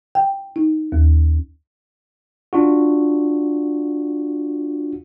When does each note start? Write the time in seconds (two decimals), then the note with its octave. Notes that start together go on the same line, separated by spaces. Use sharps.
0.15 G5
0.56 D#4
0.92 D#2
2.53 D4 F4 F#4